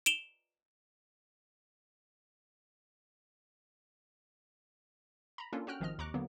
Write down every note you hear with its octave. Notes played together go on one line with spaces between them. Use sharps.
D7 E7 F7 G7
A#5 B5
A#3 C#4 D4 F4 A4
C#4 F#4 G5 F6 F#6
G#1 D#3 F3 C4 D#5 F6
D#2 A#5 C#6 D6 F#6
D3 F#3 A#3 B3